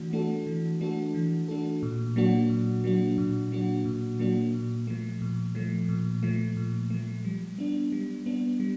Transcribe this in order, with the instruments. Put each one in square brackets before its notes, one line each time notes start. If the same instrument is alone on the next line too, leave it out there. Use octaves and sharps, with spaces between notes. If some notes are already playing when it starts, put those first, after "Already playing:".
Already playing: [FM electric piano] E3 A3 D4 F#4
A3 D4 F#4 A4
E3
A3 D4 F#4 A4
E3
A3 D4 F#4 A4
A#2
F#3 A#3 D4 F#4
A#2
F#3 A#3 D4 F#4
A#2
F#3 A#3 D4 F#4
A#2
F#3 A#3 D4 F#4
A#2
F3 A3
A#2
F3 A3
A#2
F3 A3
A#2
F3 A3
G3
B3 D4
G3
B3 D4
G3